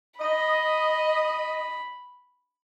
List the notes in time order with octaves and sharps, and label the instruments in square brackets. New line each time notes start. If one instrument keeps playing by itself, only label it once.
[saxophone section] D#5 [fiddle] B5